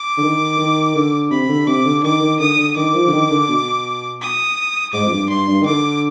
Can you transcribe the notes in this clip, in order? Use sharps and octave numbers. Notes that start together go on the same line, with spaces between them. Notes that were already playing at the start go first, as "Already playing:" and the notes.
Already playing: D6
D3
D#3
D#3
D3
C3 B5
D3
C3 D6
D3
D#3 D6
D#3
D3 D#6
D3
D#3 D6
F3
D3
D#3
D3
B2
D#6
G#2 D6
F2
G2
G2 C6
G2
D#3
D3 D6